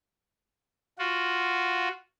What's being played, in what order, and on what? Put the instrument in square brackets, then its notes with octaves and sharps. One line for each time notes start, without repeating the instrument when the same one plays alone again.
[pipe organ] F4 F#4